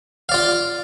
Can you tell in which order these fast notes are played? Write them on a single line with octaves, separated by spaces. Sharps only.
F5 D5 F4